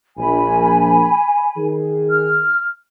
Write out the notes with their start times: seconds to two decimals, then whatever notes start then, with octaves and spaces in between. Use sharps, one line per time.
0.18 A#1 G#5 B5
1.57 D#3 G#4
2.09 F6